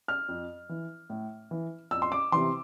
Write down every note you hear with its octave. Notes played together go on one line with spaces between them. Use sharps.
F6
F2
E3
A2
E3
F2 E6
C6
D6
C3 E3 C6